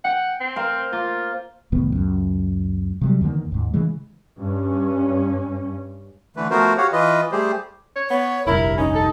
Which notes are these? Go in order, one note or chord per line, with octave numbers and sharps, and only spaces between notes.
F#5 G5
C4
A#4 C5 F5
A#3 F4
C2 A2 D#3 B3
C#2 F#2
C3 F#3 G3
E2 D3 D#3 A#3
D#2 G#2
C#3 E3 G#3
G2 C#4
D3 E3 A3 B4
F3 A3 B3 F#4 A#4 C5
F#4 G4 C#5 F5 F#5
E3 F4 B4 D#5
G3 A3 G4 G#4 C5
C#5
B3 C#5
F1 A#1 G2 E4 A#4
C#4 D#4
A4